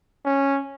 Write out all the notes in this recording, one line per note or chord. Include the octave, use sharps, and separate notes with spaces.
C#4